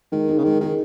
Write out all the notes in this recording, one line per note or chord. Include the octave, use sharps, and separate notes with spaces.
D#3 G#3
D#4 G#4
C#3
D#3 G#3
D#3 D#4 G#4